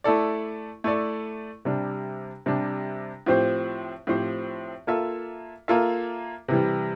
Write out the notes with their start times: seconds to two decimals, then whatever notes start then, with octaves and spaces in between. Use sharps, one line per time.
0.04 A3 E4 A4 D5
0.84 A3 E4 A4 D5
1.65 C3 G3 D4
2.46 C3 G3 D4
3.26 A2 F3 C4 G4 C5
4.07 A2 F3 C4 G4 C5
4.87 A#3 F4 A4 E5
5.68 A#3 F4 A4 E5
6.48 C3 E3 G3